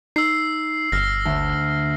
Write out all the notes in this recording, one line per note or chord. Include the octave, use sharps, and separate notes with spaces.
D#4 E6 C7
G1 F6 A#6
D2